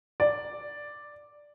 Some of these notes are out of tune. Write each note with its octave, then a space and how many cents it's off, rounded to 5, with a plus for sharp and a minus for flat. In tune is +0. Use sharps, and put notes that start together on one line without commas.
D5 +0